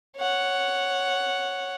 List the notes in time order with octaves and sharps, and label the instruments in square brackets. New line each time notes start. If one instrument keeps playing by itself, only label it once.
[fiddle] C#5 F#5